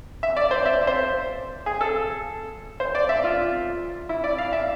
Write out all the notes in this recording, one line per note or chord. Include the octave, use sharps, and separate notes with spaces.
E5
D5
C5
E5
C5
G#4
A4
C5
D5
E5
F4
E4
D5
F5
E5